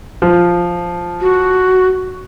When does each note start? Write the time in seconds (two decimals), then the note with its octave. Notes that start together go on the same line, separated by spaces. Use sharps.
0.22 F3
1.21 F#4